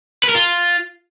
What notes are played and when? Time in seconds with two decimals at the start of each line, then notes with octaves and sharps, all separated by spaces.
0.24 B4
0.29 A#4
0.35 F4